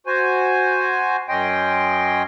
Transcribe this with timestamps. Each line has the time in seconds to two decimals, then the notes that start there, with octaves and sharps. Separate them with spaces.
0.07 F#4 C5 G#5
1.29 F#2 C#4 D#5 G5 C6